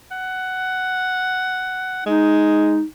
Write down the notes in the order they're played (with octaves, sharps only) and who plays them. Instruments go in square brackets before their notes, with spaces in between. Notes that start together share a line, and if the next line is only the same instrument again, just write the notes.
[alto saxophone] F#5
[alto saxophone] G#3 [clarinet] D#4